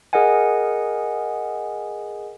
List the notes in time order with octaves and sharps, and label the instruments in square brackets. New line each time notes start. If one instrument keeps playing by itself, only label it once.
[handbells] G#4 A#4 D#5 F#5 G#5